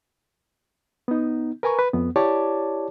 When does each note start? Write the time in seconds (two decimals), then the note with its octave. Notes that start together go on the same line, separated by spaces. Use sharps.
1.08 B3 D#4
1.63 A#4 B4 G#5 A#5 C#6
1.79 B4
1.93 F2 B3
2.16 E4 G4 C#5 D5 A5 D6